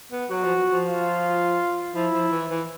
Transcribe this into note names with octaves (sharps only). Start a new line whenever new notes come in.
B3
F#3 F#4
F3
F3
F4
F3 E4
F3
E3
E3